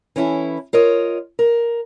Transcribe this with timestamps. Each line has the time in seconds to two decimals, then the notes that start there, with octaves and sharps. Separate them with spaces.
0.16 E3 C#4 E4 A4
0.73 F4 A#4 C#5 D#5
1.39 A#4